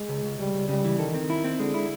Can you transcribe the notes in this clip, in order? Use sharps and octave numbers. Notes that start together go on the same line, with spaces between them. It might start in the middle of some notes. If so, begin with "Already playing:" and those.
Already playing: G#3
C#2
C#2
C#2 G3
C#2
C#3 G3
E3
D#3 A4
C4
E4
C4
D3 G#3
E4